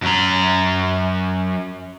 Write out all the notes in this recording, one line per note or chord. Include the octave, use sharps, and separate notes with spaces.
F#2 A#5